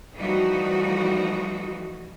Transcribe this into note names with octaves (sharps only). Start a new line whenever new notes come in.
E3 F3 G3 A3 D#4 F#4